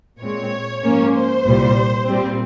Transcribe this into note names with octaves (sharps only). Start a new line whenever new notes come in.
A#2 G#3 C4 C#5
G#2 F3 A#3 C#4
C5
C2 A#2 G3
A#2 G3 C4